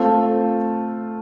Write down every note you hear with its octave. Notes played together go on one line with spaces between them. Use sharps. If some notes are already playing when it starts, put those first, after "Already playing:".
Already playing: A3 C4 F4 A4